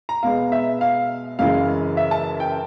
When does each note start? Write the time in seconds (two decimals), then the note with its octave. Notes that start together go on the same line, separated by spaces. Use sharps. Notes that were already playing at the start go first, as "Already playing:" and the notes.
0.09 A#5
0.23 B2 G#3 B3 F5
0.52 E5
0.81 F5
1.39 F#2 C#3 E3 G#3 F5
1.97 E5
2.11 A5
2.40 G5